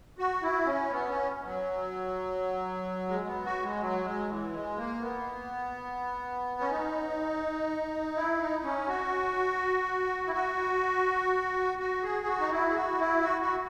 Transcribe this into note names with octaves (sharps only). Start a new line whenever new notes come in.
F#4
E4
C#4
B3
C#4
F#3
G#3
B3
F#4
G#3
F#3
G#3
E3
G#3
A#3
B3
C#4
D#4
E4
D#4
C#4
F#4
E4
F#4
F#4
G#4
F#4
D#4
E4
G#4
F#4
E4
F#4
F#4